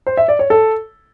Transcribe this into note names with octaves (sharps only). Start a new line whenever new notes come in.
C5
E5
D5
C#5
A4